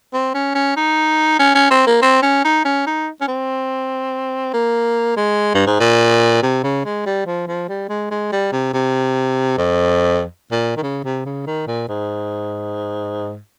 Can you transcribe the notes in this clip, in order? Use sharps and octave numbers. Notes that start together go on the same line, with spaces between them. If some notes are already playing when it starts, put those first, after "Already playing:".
C4
C#4
C#4
D#4
C#4
C#4
C4
A#3
C4
C#4
D#4
C#4
D#4
C#4
C4
A#3
G#3
G2
G#2
A#2
C3
C#3
G#3
G3
F3
F3
G3
G#3
G#3
G3
C3
C3
F2
A#2
D#3
C#3
C3
C#3
D#3
A#2
G#2